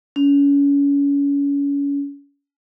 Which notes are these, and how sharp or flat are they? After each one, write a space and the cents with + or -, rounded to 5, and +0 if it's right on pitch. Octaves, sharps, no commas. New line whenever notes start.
C#4 +30